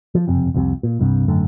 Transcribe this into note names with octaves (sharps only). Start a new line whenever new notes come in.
F3
F#1 F2 C3
C2 F2 A2 C3
A#2
C2 G2 C3
G#1 F#2 D3 A3